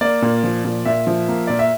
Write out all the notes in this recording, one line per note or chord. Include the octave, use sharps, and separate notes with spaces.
A#3 D5
A#2
F3
A#2
A#2 E5
F3
A#3
A#2 D5
E5